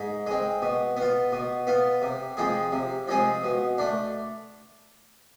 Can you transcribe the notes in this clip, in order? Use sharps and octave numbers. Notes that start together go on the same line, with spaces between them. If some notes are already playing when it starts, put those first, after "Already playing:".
Already playing: G#2
G#3 C4
B2
B3 F4
B2
B3 F4
C3
F3 G#3 C4 G#4
C3
F3 G#3 C4 G#4
B2
A3 D4